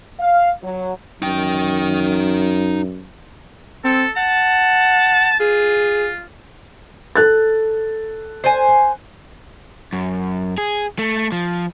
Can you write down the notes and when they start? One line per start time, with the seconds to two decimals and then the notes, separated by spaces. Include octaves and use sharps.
0.19 F5
0.62 F#3
1.22 F#2 D#4 G5
3.85 C4 A4
4.17 F#5 A5
5.40 F4 G#4
7.16 A4 F#6 A6
8.44 C5 G#5
9.93 F#2
10.58 G#4
10.99 A3
11.32 F3